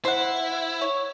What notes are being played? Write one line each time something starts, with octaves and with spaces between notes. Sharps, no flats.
E4 C5 F#5
C#5